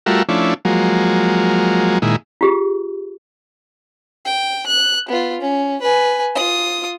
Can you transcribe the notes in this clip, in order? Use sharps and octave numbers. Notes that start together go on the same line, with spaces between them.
G3 A3 F4 F#4 A#4 E5
F3 A3 C#4 D4 E4
F3 F#3 G#3 A#3
A#2 D#3 G#3 E4
F4 G4 G#4
G5
F#6
B3 F4
C#4
B4 G#5
F4 D#6